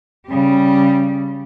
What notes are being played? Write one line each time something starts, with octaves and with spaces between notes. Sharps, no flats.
C#3 G3